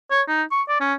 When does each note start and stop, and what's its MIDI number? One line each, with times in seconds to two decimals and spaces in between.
0.11 0.22 73
0.28 0.42 63
0.51 0.62 85
0.69 0.79 74
0.81 0.93 61